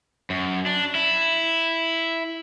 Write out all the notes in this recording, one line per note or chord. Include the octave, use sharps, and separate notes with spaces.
F#2
D4
E4